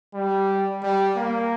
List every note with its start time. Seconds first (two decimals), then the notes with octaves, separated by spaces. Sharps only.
0.14 G3
0.83 G3
1.16 A#3